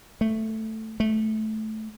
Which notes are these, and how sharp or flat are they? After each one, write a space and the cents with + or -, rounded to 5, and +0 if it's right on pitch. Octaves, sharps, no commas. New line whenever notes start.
A3 +5
A3 -15